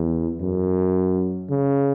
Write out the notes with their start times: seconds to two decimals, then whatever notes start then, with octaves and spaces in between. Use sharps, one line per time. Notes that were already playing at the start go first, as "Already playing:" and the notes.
Already playing: E2
0.41 F#2
1.50 C#3